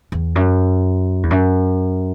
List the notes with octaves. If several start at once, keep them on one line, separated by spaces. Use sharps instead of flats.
E2
F#2
E2
F#2